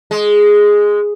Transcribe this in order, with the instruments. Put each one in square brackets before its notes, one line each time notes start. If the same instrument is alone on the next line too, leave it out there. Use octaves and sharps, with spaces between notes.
[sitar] G#3